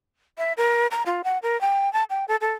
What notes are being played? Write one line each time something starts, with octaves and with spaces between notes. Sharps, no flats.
E5
A#4
A#5
F4
F#5
A#4
G5
A5
G5
A4
A4